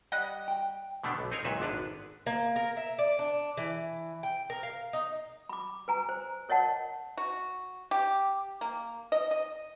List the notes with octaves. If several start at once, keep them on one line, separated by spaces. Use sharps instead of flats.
G3 D#5 F#5
G5
B2 D3 A3 B3 D4
B1
C4 D#4 G#4 A#4 C#5
C#2 A#2 F#3 B4 E5
G#1 D3 B3 D4 B4
A#3
A#4
E5
D5
D4
E3
G5
A#4
F5
D#4
B5 D6
B4 G#5 A#5
C5
A#4 C#5 D#5 F#5 A5
F#4
G4
A#3
D#5
D#5